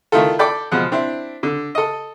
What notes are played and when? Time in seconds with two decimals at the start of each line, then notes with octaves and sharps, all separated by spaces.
0.12 D#3 A3 E4 F4 A4
0.39 A4 D5 G5 B5
0.71 B2 F3 G#3 F#5
0.92 C4 D4 E4
1.43 D3
1.75 A4 D#5